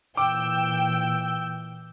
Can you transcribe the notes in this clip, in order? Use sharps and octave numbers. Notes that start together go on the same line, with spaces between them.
A#2 E3 G5 D6 E6 G6